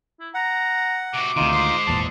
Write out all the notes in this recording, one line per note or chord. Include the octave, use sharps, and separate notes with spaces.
E4
F#5 A#5
C3 F#4 D6
D2 C3 D#3 D#4 F4
G#3 C5
G#1 E2 A#2 A5